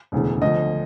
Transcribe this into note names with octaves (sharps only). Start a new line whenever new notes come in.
E1 D2 C#3 E3
D2 D3 F3 D#5